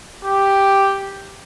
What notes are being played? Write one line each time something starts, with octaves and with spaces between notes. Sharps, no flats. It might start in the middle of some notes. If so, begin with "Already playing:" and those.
G4